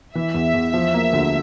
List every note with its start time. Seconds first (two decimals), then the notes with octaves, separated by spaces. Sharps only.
0.15 E3 E5
0.34 E2
0.54 E2
0.74 F3
0.94 A#3
1.13 D2